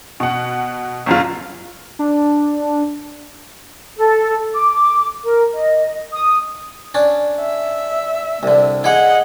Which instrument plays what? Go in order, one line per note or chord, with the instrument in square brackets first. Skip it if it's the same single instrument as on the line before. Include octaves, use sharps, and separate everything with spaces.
[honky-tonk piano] B2 F#5
G1 F#2 F4
[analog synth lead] D4
[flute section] A4
D6
A#4
D#5
D#6
[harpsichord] C#4 D4
[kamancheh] E5
[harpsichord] C2 D3
[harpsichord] E4 G#4 [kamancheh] D#5 F#5